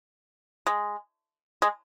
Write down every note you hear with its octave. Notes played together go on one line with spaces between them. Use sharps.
G#3
G#3